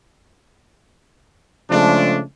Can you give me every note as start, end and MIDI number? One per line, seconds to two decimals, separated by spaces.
1.71 2.22 49
1.71 2.22 53
1.71 2.22 56
1.71 2.22 57
1.71 2.22 62